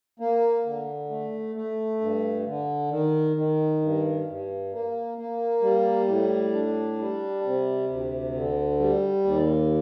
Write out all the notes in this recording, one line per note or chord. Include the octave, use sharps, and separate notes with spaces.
A#3
D3
A3
A3
G2
D3
D#3
D#3
G2
G2
A#3
A#3
G3
A2
D4
G3
C3
D2
D3
G3
D#2